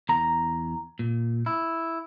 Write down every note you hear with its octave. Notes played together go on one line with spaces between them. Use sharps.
E2 A#5
A#2
E4